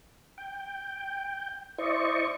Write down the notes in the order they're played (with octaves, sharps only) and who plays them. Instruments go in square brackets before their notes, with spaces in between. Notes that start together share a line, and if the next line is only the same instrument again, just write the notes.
[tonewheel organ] G5
E4 C5 D5 D#5 C#6